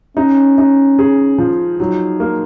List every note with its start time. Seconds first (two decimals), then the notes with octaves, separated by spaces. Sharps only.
0.17 C#4 D#4
0.58 D#4
0.99 G#4
1.38 F3
1.79 F#3 D#4
2.20 A#3